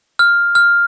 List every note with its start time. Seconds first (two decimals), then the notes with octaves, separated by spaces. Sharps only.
0.19 F6
0.55 F6